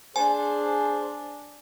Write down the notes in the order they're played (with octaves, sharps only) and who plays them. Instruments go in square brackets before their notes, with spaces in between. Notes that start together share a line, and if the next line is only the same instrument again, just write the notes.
[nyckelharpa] D4 [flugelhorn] G#4 [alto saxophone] C5 [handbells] G#5